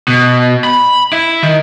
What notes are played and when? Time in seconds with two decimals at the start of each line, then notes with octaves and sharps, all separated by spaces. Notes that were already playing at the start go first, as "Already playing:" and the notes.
0.08 B2
0.64 B5
1.13 E4
1.43 D#3